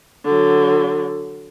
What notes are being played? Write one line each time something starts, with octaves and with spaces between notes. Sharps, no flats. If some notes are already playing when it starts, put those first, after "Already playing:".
D3 F#3